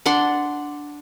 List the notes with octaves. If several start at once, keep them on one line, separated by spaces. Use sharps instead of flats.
D4 F#5 C6 D6